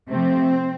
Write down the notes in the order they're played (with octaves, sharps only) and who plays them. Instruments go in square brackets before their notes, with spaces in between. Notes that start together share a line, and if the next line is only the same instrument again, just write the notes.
[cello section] C3 F3 A3 C4